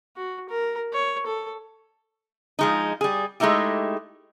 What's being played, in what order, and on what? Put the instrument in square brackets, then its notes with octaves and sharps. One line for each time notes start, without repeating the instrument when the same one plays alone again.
[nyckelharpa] F#4
A#4
C#5
A4
[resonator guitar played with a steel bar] F3 G#3 D#4
G3 G#4
G#3 A3 D#4 E4 G4